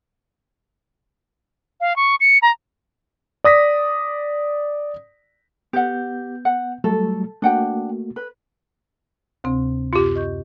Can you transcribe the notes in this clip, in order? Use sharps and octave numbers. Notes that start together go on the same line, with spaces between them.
F5
C#6
C#7
A#5
D5 D#6 A#6 B6
B3 G4 F#5 G6
F#5
F#3 G3 A3 A4
A3 A#3 D4 F#4 F#5 G5
B4
D2 C3 C4
F#2 F4 G4
D#5 C#6 G6